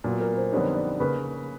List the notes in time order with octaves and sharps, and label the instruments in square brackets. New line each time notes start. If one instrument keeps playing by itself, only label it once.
[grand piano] A#2 F#3 B3
[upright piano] A#4
C5
[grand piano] F2 D3 G3 B3 D#4 [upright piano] C#5
[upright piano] D5
[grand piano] C#3 A#3 [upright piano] B4